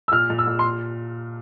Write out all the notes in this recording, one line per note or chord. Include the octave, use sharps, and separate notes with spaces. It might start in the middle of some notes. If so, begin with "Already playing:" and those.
E6
A#2 F6
A#2
E6
A#2
C6